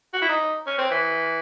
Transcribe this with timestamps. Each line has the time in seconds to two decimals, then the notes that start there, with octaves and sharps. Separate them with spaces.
0.14 F#4
0.22 E4
0.29 D#4
0.67 C#4
0.78 C4
0.91 E3